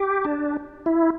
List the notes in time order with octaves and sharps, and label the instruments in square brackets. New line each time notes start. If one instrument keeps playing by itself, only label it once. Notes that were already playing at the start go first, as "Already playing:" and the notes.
Already playing: [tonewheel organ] G4
D4
E4